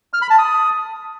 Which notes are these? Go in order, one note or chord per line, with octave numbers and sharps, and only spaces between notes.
F6
B5
A5
D#6